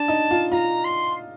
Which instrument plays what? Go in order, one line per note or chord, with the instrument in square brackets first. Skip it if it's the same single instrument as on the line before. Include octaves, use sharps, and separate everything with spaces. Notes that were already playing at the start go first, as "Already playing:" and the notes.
Already playing: [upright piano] D4 [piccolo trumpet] A5
[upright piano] D#4
F4
[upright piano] F4 [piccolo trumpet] A#5
[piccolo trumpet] C6